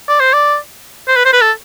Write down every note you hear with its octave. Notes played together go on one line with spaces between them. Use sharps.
D5
C5
D5
C5
B4
C5
B4
A4